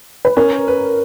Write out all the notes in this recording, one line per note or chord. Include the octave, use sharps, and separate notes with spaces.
B4
C#4 A#4
B4